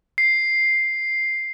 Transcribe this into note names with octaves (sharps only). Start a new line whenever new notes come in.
C7